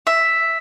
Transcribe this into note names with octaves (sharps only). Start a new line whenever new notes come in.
E5